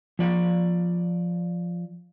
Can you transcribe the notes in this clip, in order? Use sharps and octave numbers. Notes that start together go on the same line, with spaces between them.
F3 D5